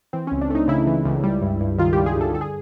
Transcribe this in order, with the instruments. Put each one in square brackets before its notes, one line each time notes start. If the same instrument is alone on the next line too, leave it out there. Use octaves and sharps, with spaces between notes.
[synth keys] E3 C4
C#2 C#4
D4
A3 D#4
C#3 E4
E3
C#2
G3
G2
G2
D#3 F4
G3 G4
G#4
G2 A4
D3 A4
G#4